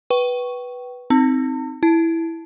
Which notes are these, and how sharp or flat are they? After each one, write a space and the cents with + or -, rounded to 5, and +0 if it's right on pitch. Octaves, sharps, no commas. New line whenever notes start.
B4 -5 G5 -30 C#6 +0
C4 -5 D#4 +0 A5 +45
E4 +0 A5 +0